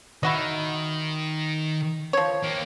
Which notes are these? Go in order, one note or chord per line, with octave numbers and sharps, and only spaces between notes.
D#3 E4 F#4 D#5
F3 C#5
A#3 G4